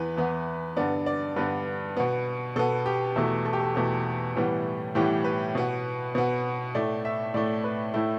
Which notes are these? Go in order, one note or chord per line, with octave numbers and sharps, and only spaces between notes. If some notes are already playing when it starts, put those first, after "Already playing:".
Already playing: E2 E3 B3 B4
E2 E3 B3
G2 D3 B3 D5
D5
G2 D3 B3 B4
B2 B3
B2 B3 A4
G4
E2 B2 A3 E4
A4
G4
A4
E2 B2 A3 G4
A2 E3 G3 B3
A2 E3 G3 B3 G4
B4
B2 B3
B2 B3
A2 A3 D5
E5
A2 A3 D5
B4
A2 A3 E4